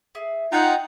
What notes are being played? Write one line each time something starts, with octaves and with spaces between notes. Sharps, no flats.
G#4 E5
D#4 F4 F#5 G5 G6